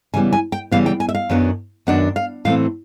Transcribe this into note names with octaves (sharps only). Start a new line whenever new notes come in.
C#3 E3 G3 B3 G#5
G#5
G5
C#3 E3 G3 B3 F5
G5
G#5
E5
F5
F#2 D#3 F#3 B3 D4
F#2 D#3 F#3 B3 D4 F#5
F5
A2 E3 A3 C4 F5